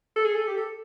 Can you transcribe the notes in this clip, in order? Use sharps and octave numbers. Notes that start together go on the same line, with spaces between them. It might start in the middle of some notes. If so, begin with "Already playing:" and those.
A4
G#4
A4
G4
A4